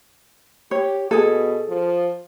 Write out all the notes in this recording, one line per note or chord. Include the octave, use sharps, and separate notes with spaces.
G4 C#5
B2 G#4 A4
F3